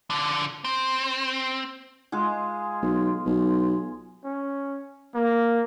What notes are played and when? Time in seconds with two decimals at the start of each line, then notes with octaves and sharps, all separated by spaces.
0.10 D3 F3
0.64 C4
2.12 G#3 F4 G#4
2.82 B1
3.26 B1
4.24 C#4
5.15 A#3